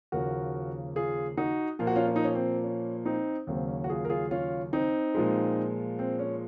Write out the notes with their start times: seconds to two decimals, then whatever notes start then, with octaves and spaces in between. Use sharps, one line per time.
0.12 D#2 C#3 F3 A#3 F#4 A#4
0.96 F4 G#4
1.37 D#4 F#4
1.79 A#2 F3 A#3 F4
1.87 F#4
1.96 C#4 F4
2.07 C#4
2.16 D#4
2.24 C#4
2.35 C4
2.64 C#4
3.05 C4 D#4
3.47 D#2 C#3 F#3 C4
3.68 C#4
3.84 F#4
3.90 F4 G#4
4.05 A#4
4.10 F4 G#4
4.31 C#4 F4
4.73 C4 D#4
5.15 A#2 F3 G#3
5.99 C4
6.19 C#4